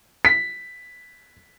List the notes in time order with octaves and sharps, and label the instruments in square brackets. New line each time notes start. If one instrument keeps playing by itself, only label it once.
[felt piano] B6